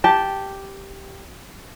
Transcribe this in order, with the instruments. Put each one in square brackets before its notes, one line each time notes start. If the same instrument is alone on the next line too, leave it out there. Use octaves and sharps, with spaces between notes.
[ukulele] G4 A5